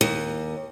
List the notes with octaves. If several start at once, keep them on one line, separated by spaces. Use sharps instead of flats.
D#2